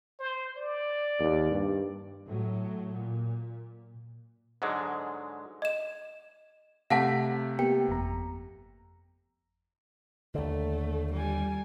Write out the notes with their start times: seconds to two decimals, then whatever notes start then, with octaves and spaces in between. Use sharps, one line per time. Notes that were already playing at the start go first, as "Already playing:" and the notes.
0.20 C5
0.57 D5
1.19 D#2
1.51 G2
2.29 A2 F#3
2.92 A#2
4.62 G#2 D3 F#3 G#3
5.62 D#5 E7
6.90 C3 A3 F5 F#5 A5 B6
7.59 A#3 B3 G4 G5
7.88 G1 F2 A#5
10.35 D#2 D3 A3
11.13 G3 G#5